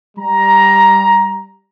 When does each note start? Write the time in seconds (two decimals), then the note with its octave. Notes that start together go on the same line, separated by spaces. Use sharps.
0.18 G3 A#5